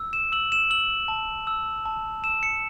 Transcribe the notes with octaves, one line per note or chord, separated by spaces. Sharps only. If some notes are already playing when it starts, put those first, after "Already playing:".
Already playing: E6
E7
E6 F#7
E7
E6 F#7
A5
E6
A5
E6 E7
C#7